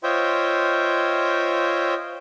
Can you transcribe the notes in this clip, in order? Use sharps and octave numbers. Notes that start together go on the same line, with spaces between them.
F4 C5 C#5 D#5 E5 G5